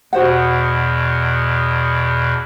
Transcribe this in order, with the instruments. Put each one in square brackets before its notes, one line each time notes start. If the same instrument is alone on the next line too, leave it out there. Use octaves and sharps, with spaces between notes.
[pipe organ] E2 B2 [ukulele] F#4 C5 F#5